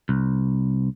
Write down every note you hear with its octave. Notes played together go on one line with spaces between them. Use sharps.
C2